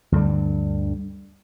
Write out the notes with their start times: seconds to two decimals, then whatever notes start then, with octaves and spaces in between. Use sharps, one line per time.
0.12 D2 G2 D3 G3